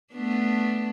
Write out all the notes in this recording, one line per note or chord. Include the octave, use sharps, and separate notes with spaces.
A3 B3 D4